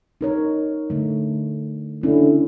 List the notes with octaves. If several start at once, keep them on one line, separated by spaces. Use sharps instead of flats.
D#4 A#4 C#5
D3 A3
D3 C#4 E4